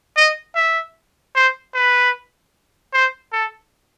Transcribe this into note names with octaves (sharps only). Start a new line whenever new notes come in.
D#5
E5
C5
B4
C5
A4